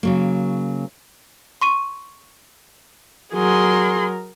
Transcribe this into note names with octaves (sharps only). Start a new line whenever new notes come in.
C#3 F#3 A#3
C6 C#6 D#7
F#3 G#4 A#4 C6